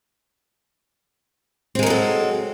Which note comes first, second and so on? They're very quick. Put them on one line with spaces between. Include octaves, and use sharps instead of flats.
C4 G#3 A#4 F#3 A4